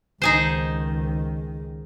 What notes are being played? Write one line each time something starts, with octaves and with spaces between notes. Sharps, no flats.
C#2 D#3 D#4 G#4 C5